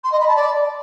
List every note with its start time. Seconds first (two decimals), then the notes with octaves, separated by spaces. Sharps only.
0.03 C6
0.11 D#5
0.19 B5
0.28 A5
0.36 D5